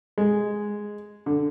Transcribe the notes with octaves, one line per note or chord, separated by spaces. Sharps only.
G#3
D3